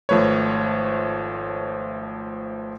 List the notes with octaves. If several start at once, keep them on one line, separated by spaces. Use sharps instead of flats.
G#1 F3 A3 B4 C#5